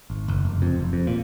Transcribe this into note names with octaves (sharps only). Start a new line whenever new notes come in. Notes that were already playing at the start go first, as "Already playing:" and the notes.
G#1
F#1
F1
F2
F1
F2
A#2